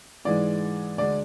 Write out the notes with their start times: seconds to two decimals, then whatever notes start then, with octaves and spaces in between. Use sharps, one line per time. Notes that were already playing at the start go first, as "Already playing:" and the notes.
0.25 G#2 E3 G#3 D5
0.98 D2 D3 G#3 D5